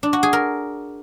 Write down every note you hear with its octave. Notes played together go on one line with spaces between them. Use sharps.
D4
F#4
G#4
A#4